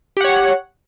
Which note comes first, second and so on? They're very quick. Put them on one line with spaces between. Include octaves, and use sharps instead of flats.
G4 F#5 C#5